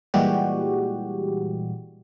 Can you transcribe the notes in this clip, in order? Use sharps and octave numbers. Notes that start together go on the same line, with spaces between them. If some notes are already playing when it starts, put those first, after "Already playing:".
A#2 E3 G3 G#3 F#4 G4